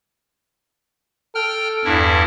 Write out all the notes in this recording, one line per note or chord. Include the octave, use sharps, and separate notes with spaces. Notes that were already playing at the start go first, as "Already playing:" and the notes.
A4 G5 F6
E2 G2 E4